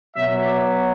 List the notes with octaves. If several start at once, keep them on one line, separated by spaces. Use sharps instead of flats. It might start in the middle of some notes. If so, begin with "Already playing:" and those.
B2 F#3 E5
D5